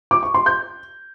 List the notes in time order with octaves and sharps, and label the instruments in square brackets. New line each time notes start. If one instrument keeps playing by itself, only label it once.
[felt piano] D6
C#6
C6
G6